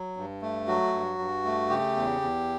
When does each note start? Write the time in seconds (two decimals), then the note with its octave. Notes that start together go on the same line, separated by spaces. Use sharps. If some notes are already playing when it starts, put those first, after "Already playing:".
Already playing: F#3
0.17 G2
0.42 A3
0.67 F#3 F#4
0.93 G2
1.19 G2
1.45 A3
1.69 C#3 G4
1.96 E2
2.21 E2